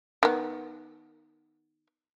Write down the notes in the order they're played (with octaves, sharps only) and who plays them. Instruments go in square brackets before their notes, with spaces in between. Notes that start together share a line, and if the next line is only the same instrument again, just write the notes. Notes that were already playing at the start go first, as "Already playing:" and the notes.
[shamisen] D#3 B3